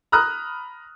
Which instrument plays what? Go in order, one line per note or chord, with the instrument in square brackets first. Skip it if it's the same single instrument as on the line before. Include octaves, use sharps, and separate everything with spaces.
[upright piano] A#5 B5 D#6 F6 F#6